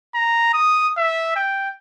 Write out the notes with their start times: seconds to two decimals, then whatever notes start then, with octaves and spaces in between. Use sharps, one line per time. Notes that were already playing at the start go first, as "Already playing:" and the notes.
0.15 A#5
0.54 D#6
0.97 E5
1.36 G5